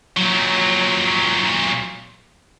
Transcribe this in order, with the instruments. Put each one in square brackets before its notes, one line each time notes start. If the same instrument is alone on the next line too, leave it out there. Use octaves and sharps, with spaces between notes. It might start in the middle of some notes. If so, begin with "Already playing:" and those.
[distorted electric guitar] A#2 F#3